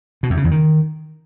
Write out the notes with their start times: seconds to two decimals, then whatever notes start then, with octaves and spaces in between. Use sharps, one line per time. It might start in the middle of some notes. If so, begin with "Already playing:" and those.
0.23 B2
0.30 E2
0.37 C#3
0.44 E2
0.51 D#3